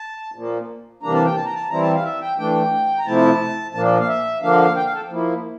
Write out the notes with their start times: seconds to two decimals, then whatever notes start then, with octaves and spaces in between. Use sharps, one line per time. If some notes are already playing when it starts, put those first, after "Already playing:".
Already playing: A5
0.35 A#2 F3 A#3
1.03 C3 E3 G3 A#3 D4 A#5
1.14 A5
1.26 G5
1.37 A5
1.45 A#5
1.55 A5
1.71 E3 G3 C4 E4 A#5
1.82 A5
1.94 F5
2.04 E5
2.21 G5
2.38 E3 A3 D4 G5
2.99 A#5
3.06 C3 F3 A3 E4 A5
3.74 A#2 F3 A#3 D4 A5
4.00 F5
4.08 E5
4.42 D3 F3 A#3 D4 F5
4.76 G5
4.85 F5
4.93 A4
5.10 F3 A#3 E4